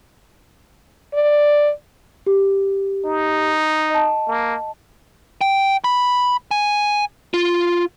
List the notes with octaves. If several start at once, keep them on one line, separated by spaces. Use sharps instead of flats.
D5
G4
D#4
D#5 A5
A#3
G5
B5
G#5
F4